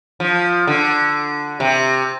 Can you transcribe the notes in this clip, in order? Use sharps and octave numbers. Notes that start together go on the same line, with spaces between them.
F3
D3
C3